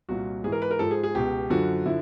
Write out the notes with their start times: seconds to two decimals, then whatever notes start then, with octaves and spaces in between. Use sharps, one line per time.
0.09 C2 A#2 F3 F#4
0.44 G#2 E3 G#4
0.52 A#4
0.62 B4
0.71 A#4
0.79 G#2 F3 A4
0.91 G#4
1.03 G#4
1.15 C#2 B2 G4
1.50 F#2 D3 F3 F#4
1.86 D3 F3 E4